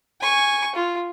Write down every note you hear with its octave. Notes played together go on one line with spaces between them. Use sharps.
G#5 C#6
F4